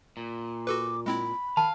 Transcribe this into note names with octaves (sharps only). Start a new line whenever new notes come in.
A#2
F#4 A4 B4 D6
G#3 C4 E4 B5
D#3 F5 A5